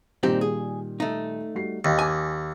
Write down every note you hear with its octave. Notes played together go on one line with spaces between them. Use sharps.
A#2 D#3 G3 C4 D#4 G4
G#4
A3 D#4
G3 F#4 C7
D#2 D#5 F5 G5
G#5 D6 G#6